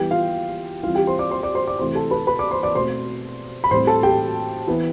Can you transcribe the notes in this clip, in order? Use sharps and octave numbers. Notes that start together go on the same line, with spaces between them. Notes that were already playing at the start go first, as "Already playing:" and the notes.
Already playing: E3 G3 B3 G4 G5
F4 F5
E3 G3 C4 F4 F5
G4 G5
C5 C6
D5 D6
C5 C6
D5 D6
C5 C6
D5 D6
C3 E3 A3 C5 C6
A4 A5
B4 B5
B4 B5
D5 D6
C5 C6
D5 D6
B2 A3 C4 C5 C6
B5
A2 G3 C4 C5 C6
A4 A5
G4 G5
E3 B3